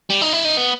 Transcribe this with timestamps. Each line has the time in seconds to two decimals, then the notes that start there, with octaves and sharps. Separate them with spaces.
0.10 G3
0.22 D#4
0.33 E4
0.45 D#4
0.57 B3